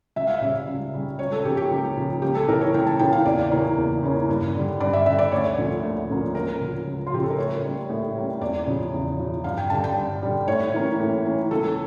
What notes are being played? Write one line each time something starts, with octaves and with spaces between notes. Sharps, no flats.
C#2 E5
F5
C#3 G3 C#4 E5
C#2
C#3 G3 C#4
C#2 C#5
A4
C#3 F3 A#3 G4
G4
C#2
C#3 F3 A#3
C#2 G4
A4
C#3 E3 A#3 A#4
C#5
C#2 G5
A5
C#3 E3 A#3 G5
F5
E2 D5
C#3 E3 A#3 C#4
E2
C#3 E3 A#3 C#4
G2
D3 G3
G2 D5
E5
D3 G3 E5
D5
D2 C#5
D3 F3 A#3 C#4
D2
D3 F3 A#3 C#4
C#2 A#4
C#3 F3
C#2
F4
C#3 F3 G4
A4
A#4
A2 C#5
G3 A#3 C#4
A2
G3 A#3 C#4
E2 D5
C#3 F3
E2
C#3 F3
G2 F5
G5
D3 G3 A5
G5
G2
D3 G3
A2 C#5
E3 A#3 C#4
A2
E3 A#3 C#4
C#2 A4